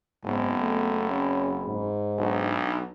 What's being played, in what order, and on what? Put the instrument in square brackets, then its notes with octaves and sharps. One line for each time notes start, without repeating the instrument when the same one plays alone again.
[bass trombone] F#1 [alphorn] G#2 [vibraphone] B3 C4
[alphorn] A3
[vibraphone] C4 G#4 B5 [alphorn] C#4
[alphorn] G#2
[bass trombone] B1 [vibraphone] D4 D#4